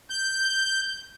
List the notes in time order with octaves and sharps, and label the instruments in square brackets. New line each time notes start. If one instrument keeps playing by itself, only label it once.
[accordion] G6